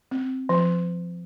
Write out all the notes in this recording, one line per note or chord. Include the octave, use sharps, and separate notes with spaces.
C4
F3